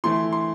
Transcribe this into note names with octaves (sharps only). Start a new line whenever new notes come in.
E3 A3 E4 C6
C6